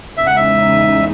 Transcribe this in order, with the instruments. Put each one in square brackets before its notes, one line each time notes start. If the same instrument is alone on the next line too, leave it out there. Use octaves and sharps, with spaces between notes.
[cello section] E2 C#3 G#3 D#4 [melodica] E5
[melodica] F#5
E5